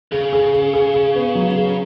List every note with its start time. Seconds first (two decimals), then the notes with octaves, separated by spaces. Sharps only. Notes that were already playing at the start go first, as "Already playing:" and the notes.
0.12 C#3 G#4
0.33 G#4
0.53 G#4
0.73 G#4
0.94 G#4
1.15 B3
1.35 F#3
1.56 G#4